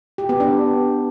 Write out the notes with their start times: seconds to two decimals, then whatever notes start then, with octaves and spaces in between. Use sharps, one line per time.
0.18 G4
0.29 B3
0.40 D4